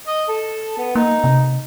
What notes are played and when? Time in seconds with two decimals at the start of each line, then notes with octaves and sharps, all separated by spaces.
0.07 D#5
0.28 A4
0.78 B3
0.95 A#3 D#4
1.24 C3